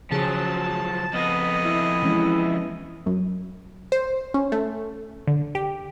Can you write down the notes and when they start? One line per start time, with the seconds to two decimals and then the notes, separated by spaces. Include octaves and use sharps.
0.11 C#3 F3 F#3 G#4 A5
1.13 F2 B3 D#5
1.65 E4
2.03 E3 G#3 C#4
3.06 F#2
3.92 C5
4.34 C#4
4.52 A3
5.27 D3
5.55 G4